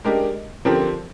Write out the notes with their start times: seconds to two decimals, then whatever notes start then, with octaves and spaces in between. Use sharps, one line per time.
0.04 G#3 D4 G4 A#4
0.65 D3 F3 C4 G4 A#4